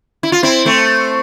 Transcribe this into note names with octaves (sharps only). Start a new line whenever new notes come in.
E4
F4
C4 E4
A3 C4